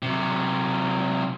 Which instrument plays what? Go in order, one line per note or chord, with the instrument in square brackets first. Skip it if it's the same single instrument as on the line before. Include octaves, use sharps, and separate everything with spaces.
[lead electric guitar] C3 F#3